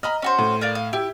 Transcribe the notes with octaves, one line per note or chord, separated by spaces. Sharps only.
D#5 A#5 B5 F6
C#4 F#4 C5
A2
A#4 D5 F5
F5
E4 G4